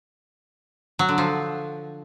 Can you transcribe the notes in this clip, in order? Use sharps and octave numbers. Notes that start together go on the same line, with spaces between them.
F#3
D3
F3